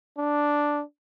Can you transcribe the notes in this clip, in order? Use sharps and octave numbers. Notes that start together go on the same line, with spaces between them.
D4